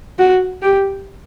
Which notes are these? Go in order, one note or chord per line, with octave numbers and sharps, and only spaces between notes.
F#4
G4